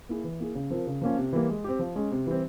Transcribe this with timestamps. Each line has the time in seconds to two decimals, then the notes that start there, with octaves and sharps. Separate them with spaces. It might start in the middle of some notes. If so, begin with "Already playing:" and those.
0.09 A#3 E4 G#4
0.24 E3
0.40 A#3 E4 G#4
0.55 C#3
0.70 F3 C4 F4 A#4
0.87 C#3
1.02 F3 A#3 C#4 F4
1.17 C3
1.33 E3 G3 A#3
1.49 G#3
1.64 C4 G4
1.79 F3
1.96 G#3 C#4
2.12 C3
2.27 E3 G3 C4